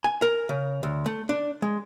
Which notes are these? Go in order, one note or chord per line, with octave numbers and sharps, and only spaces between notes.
G#5
A#4
C#3
D2
A3
D4
G#3